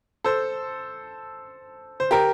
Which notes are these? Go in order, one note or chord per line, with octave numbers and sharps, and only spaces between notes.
A4 C5
C5
G4 A#4